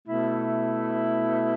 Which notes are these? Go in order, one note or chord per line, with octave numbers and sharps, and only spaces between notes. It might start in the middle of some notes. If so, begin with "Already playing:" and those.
B2 A3 E4